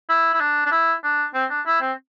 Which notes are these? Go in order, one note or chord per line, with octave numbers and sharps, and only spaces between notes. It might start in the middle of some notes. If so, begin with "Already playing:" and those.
E4
E4
D4
D4
E4
D4
C4
D4
E4
C4